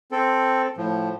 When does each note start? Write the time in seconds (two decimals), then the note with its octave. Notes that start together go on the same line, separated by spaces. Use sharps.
0.11 C4 A4
0.77 A2 F3